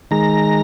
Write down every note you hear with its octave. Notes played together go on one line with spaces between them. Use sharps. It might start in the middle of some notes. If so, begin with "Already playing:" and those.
D#3 G#3 A#5